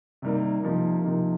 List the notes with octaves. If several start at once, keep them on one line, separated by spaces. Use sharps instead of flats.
C3 D#3 G3 A#3 D#4
C3 F3 A#3 D#4
C3 F3 A#3 D#4